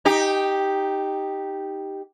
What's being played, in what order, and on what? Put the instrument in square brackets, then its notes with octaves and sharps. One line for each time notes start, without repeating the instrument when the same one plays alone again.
[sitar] D#4 G4